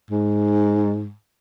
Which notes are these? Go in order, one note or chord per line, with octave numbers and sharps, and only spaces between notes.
G#2